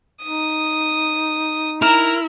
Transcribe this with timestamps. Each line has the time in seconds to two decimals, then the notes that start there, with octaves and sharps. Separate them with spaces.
0.23 D#4 D#6
1.82 E4 A#4 A#5